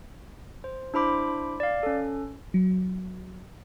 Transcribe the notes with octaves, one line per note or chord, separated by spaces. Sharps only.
C5
D4 E4 C5 B5 D6
D5 F5
C#4 A4
F#3